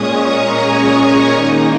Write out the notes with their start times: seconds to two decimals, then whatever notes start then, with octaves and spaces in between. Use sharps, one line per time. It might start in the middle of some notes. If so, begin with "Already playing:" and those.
Already playing: A#2 G#3 C#4 C#6 D#6
0.16 A#5
0.45 G#5
1.30 D#3 A#3 D#4